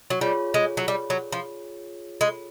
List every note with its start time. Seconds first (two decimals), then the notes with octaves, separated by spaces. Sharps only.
0.10 F#3
0.21 G3 F4 G#4 C#5
0.54 G#3
0.77 F#3
0.88 G3
1.10 F#3
1.32 F3
2.21 G#3